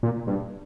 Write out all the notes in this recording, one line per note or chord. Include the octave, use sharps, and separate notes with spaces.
A#2
G2